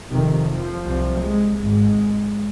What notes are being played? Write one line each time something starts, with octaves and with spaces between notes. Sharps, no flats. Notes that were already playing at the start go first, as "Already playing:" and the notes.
F1 F2 C3 D#3
F3
C2 C3
G#3
G#1 G#2 G#3